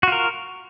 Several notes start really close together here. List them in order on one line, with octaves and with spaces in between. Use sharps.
F#4 F4 A#4